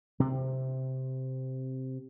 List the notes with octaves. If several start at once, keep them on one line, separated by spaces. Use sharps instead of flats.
C3 C4